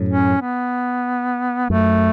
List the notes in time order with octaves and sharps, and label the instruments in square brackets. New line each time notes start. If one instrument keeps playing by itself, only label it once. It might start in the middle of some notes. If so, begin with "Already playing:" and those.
Already playing: [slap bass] F#2 A2
[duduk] C#4
B3
[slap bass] F#2 [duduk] A3